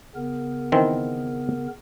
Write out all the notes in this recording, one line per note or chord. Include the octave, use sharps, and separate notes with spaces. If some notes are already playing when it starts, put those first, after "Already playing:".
C#3 B3 A#4
D#3 E3 C4